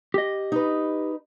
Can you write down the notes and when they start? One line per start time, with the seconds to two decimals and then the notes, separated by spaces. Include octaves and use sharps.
0.14 G4 D#5
0.52 D#4 B4